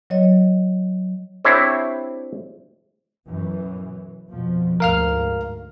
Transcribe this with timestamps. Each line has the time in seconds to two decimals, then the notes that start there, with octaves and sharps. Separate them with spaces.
0.10 F#3 C#5 D#5
1.45 C4 D4 E4 G4 C5 C#5
3.27 F#2 B2 E3
4.30 F2 B2 F3
4.80 D2 G#2 A#4 F5 F6